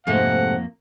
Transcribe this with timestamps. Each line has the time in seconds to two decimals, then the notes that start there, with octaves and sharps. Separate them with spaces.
0.07 F2 G#2 C3 A3 A#3 F#5